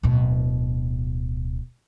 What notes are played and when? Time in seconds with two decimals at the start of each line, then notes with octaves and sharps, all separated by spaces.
0.03 D1 B2